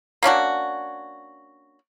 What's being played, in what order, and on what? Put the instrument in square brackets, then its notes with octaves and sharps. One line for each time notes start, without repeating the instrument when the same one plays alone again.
[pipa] A#3 C#4 D4 F#4